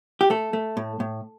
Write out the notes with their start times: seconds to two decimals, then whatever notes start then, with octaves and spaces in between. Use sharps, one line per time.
0.21 G4
0.30 A3 A4
0.53 A3
0.77 A2
1.00 A2